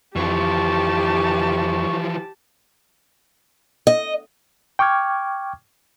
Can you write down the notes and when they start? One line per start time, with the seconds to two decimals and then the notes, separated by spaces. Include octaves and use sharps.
0.16 F2 E3 F3 G4 A5 C#6
3.87 D#5
4.79 G5 C#6 D6 F6 G#6